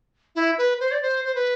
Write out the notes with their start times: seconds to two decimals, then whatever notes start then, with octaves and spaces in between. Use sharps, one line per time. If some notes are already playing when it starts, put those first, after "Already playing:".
0.36 E4
0.58 B4
0.80 C5
0.92 D5
1.02 C5
1.25 C5
1.35 B4